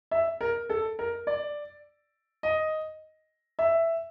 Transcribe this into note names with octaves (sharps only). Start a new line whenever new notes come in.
E5
A#4
A4
A#4
D5
D#5
E5